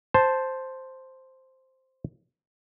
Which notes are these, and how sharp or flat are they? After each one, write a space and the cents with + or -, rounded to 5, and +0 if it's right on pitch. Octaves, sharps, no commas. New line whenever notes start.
C5 +0 A5 +0